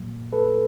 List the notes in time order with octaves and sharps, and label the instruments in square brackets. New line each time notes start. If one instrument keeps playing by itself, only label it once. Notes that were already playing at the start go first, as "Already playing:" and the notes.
Already playing: [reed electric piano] A#2 F#3 A#3
A4 B4